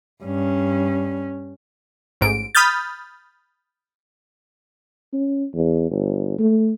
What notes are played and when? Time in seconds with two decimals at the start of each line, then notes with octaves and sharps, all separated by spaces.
0.23 G2 C#4
2.21 A1 G#2 D7
2.55 B5 D#6 F6 G6 A6
5.13 C#4
5.54 E2
5.91 G1
6.39 A3